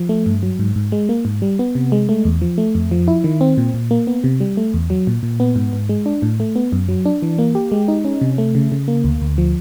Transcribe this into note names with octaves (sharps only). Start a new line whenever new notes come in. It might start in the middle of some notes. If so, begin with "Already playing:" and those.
Already playing: F3
A3
G2
F#3
G#2
G#2
G#3
A#3
G#2
G3
B3
C3
G#3
A3
E2
F3
A3
F2
F3
E4
D#3
C4
A#2
A#2
A#3
B3
C3
G3
A3
E2
F#3
A#2
A#2
B3
G#2
G#2
G#3
D4
A2
A3
B3
F#2
F#3
D4
E3
A#3
G4
G#3
D#4
C#4
C3
A3
C#3
C#3
A#3
D2
D2
F3